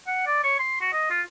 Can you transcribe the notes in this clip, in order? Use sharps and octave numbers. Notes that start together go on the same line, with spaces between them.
F#5
D5
C#5
C6
F#4
D#5
F4